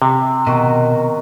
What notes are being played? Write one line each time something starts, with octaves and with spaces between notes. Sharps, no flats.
C3
B2 D#3 F#4